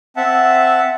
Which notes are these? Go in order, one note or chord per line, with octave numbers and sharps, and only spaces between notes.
C4 E5 F#5 A5